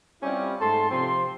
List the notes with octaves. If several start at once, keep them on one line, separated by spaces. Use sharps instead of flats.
G3 C4 C#4 E4 F4 G4
G#2 A3 A4 A5 C6
C3 F3 C4 C6